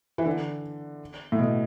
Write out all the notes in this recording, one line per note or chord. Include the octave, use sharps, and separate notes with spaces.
E3
D3
A2
B2